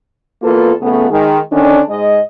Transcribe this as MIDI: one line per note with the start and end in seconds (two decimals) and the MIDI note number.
0.43 0.73 40
0.43 0.73 58
0.43 0.73 65
0.43 0.73 69
0.43 0.73 71
0.81 1.07 41
0.81 1.07 49
0.81 1.07 57
0.81 1.07 59
1.10 1.39 51
1.10 1.39 56
1.51 1.80 50
1.51 1.80 51
1.51 1.80 61
1.51 1.80 62
1.89 2.20 44
1.89 2.20 56
1.89 2.20 75